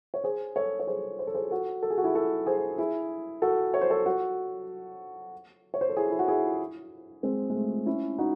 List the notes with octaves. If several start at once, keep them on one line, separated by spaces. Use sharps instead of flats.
C#5
G#4 C5
A4 C#5
C#5
G#4 C5
C5
A4
G#4 C5
F#4 A4
A4
G#4
F#4
E4 G#4
F#4 A4
G#4 C5
E4 G#4
F#4 A4
C#5
C5
A4 C#5
F#4 A4
C#5
C5
A4
E4 G#4
E4
F#4
E4 G#4
G#3 C4
G#3
A3
C#4 E4
D#4 F#4